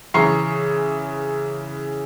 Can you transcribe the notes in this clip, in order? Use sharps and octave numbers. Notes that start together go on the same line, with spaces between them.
C#3 E3 A#5 C#6 C7